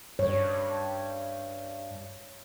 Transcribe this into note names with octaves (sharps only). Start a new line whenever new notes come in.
G2 C#5